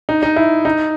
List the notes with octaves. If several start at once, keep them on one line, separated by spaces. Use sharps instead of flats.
D#4
D#4
E4
D#4